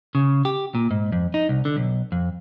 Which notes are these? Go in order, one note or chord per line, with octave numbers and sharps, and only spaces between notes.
C#3
G4
A#2
G#2
F2
D#4
C2
D3
B1
F2